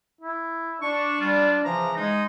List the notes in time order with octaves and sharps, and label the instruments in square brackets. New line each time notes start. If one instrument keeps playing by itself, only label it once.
[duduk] E4
[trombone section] D4 [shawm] C#6
[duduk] G3 [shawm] F4
[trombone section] C#3 E3 [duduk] F3 [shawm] A#5
[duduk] G#3 [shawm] D#4